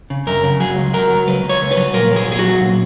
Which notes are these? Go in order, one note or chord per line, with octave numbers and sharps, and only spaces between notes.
C#3
F#2 A#4
C#3
F#3 G#4
C#2
F#3 A#4
F#3
C#2 B4
C#2
C#5
C#2
B4
F#3
A#2 A#4
F#3
G#4
A#2 G#4
F#4
F#3
A#2